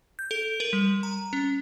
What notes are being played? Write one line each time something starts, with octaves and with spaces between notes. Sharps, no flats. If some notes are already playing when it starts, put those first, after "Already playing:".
G6
A4
A#4
G3
A#5
C#4